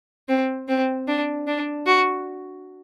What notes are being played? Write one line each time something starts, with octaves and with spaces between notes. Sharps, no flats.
C4
C4
D4
D4
F#4